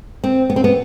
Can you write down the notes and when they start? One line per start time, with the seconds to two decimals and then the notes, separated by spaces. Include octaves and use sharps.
0.24 C4
0.50 B3
0.56 C4
0.64 B3